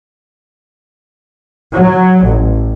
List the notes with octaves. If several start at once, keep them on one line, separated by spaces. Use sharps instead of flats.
F#3
A1